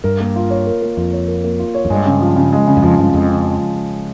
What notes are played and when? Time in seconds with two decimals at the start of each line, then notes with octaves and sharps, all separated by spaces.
0.04 G2 A#4
0.20 A#3
0.36 F4
0.50 C#5
0.67 A#4
0.82 A#3
0.97 F2 F4
1.13 C#5
1.28 A#4
1.44 A#3
1.59 F4
1.75 C#5
1.85 F2
1.90 G2 G#3
2.06 C#3
2.21 F3
2.36 C#3
2.52 G#3
2.67 C#3
2.77 G2
2.82 F2 F3
2.99 G2 C#3
3.14 F2 G#3
3.29 C#3
3.45 F3